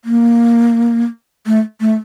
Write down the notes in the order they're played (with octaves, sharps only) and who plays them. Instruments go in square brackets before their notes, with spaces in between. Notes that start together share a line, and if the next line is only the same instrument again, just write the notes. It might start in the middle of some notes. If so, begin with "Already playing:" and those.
[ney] A#3
A3
A3